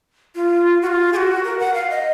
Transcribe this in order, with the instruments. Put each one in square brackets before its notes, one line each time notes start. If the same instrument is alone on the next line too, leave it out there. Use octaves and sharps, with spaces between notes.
[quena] F4
F#4
F4
G#4
F#4
A#4
F#5
F5
D#5